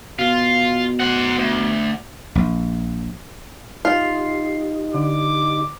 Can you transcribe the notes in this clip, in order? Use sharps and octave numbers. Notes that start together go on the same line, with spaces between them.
B2 F4
C5 F#5
D2
A#1
D#4 F4 G4 D#5 C7
D3 D6